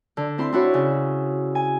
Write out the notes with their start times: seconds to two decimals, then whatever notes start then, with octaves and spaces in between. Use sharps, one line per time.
0.17 D3
0.38 C4 E4 C6
0.53 D4 E4 F#4 C#5
0.74 C#3
1.55 G#5